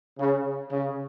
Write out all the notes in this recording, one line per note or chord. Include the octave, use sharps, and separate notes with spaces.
C#3
C#3